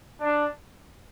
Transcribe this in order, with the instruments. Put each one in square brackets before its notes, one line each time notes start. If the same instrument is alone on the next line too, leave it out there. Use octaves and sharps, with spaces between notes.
[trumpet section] D4